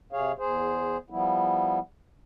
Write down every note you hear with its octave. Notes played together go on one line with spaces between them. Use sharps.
C3 G#4 C#5 F5
E2 G#4 C5
F3 G3 B3 E4